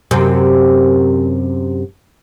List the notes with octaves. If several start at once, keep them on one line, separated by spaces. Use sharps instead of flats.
F#2 C3